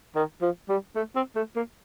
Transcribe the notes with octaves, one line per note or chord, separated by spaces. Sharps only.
D#3
F3
G3
A3
C4
A3
A#3